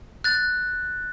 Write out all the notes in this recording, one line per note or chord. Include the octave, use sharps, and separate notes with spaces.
F#6 A6